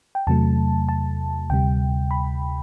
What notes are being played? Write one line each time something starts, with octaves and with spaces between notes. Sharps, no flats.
G5
E2 C3 F#3 A3 A5
A5
D2 C3 G3 G5
B5